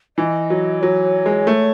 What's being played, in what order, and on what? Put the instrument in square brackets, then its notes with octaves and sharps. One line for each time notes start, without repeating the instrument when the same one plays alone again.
[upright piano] E3 [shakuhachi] D#5
[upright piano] F#3
[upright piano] F#3 [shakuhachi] C#5
[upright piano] G#3
A3